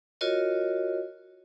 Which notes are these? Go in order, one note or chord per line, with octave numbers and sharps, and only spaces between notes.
F4 F#4 A#4 C#5 D#5